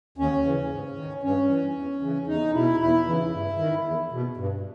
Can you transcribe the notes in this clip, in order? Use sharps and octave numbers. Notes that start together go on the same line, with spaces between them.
D#2 C#4
C#3 E3
G#2
D#3
G2 C#4
E3
E2
C#3 E3
E2 D#4
B2 E4
E2 E4
C#3 E3
G2
D#3
E2
B2
G2